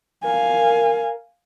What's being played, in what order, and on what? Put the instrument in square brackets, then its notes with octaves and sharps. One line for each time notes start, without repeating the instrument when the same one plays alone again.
[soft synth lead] A#4 [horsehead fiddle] F5 G#5